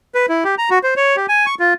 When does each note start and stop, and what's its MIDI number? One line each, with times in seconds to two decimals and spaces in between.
0.15 0.26 71
0.29 0.44 64
0.44 0.55 67
0.58 0.70 82
0.70 0.79 66
0.83 0.94 72
0.97 1.16 73
1.16 1.26 67
1.29 1.46 80
1.46 1.55 85
1.59 1.74 65